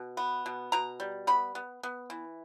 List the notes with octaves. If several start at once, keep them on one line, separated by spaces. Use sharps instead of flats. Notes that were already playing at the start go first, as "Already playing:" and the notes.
Already playing: B2
B3
B2
B2 A#5
G3
B3 B5
B3
B3
E3